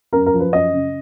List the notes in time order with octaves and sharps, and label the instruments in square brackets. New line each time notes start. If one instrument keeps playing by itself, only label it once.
[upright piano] F#2 A#4
A#4
F3
B4
F#2 D#5
C#3